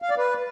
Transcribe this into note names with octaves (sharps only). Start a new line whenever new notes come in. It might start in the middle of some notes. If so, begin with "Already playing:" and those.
F5
D5
B4